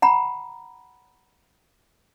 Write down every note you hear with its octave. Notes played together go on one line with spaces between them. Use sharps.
F#5 A#5 B5